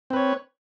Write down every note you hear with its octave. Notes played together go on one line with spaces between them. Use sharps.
C4 B4 C#5